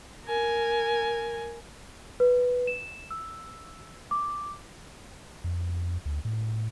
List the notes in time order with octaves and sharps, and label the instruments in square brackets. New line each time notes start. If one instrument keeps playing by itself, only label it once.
[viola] A#4 G#5
[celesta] B4
E7
E6
D6
[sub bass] F2
D2
A2